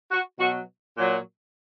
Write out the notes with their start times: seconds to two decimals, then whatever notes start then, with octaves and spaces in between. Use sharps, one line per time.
0.10 F#4
0.39 B2 F#3 F#4
0.98 A#2 F#3